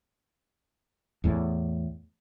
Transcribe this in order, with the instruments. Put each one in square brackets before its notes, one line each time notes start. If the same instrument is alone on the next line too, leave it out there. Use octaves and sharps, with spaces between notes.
[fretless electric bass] E2 A2